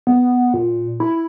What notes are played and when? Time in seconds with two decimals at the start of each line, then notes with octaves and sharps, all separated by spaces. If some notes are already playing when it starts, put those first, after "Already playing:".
0.07 B3
0.54 A#2
1.00 E4